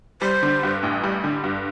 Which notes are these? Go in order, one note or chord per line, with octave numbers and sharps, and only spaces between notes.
G3 C5
D3
G2
A1
G3
D3
G2